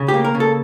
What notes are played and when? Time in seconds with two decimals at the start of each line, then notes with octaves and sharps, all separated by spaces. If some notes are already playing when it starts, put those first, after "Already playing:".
Already playing: C#3
0.08 G4
0.14 A#3
0.24 A#4
0.35 C#3
0.40 A4